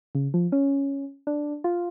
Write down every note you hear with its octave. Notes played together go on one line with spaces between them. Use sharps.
C#3
F3
C#4
D4
F4